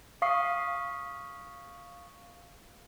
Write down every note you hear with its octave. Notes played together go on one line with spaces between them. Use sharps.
F5 C#6 D#6 C7